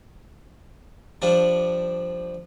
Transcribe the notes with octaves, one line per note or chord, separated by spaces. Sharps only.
F3 G3 D4